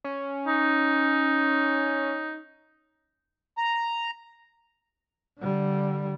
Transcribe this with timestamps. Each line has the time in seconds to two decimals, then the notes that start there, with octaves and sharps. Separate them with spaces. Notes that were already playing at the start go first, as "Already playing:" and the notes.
0.04 C#4
0.47 D#4
3.58 A#5
5.40 D3 G3